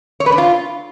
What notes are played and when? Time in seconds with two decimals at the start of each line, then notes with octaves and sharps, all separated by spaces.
0.20 C#5
0.26 B4
0.32 D4
0.38 F4